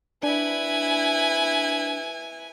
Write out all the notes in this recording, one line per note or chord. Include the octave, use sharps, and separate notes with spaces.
D4 E4 B4 G#5